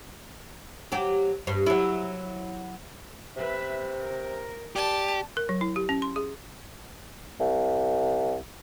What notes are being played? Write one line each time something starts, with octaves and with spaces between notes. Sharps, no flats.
F#3 G4
G2
F#3 E4
C3 B4 E5
A#4
G3 G4 A5
A#4
F#3
E4
G4
C#4
C6
G#4
C2